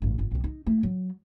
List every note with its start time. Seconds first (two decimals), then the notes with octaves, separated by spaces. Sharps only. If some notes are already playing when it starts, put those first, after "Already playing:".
0.02 A1 G2
0.18 G1 F4
0.31 B1 F2
0.44 D#4
0.67 A3 E4
0.83 F#3